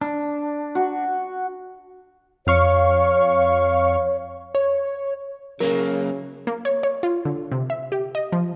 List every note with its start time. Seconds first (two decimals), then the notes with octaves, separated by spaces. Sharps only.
0.01 D4
0.75 F#4
2.47 F2 C#5 F5 C#6
4.55 C#5
5.60 C#3 F#3 A#3 A#4
6.47 A#3
6.65 C#5
6.83 C#5
7.03 F4
7.25 D3
7.52 C3
7.70 E5
7.92 G4
8.15 D#5
8.32 F3